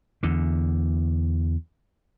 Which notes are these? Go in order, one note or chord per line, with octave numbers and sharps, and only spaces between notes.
E2 D3